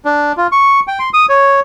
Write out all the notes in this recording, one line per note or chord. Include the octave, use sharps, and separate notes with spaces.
D4
F4
C#6
G5
C6
D#6
C#5